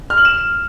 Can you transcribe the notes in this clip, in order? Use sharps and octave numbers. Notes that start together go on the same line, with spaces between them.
F6
F#7
E7